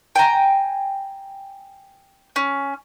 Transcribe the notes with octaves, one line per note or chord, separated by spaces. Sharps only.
G5 G#5 A#5
C#4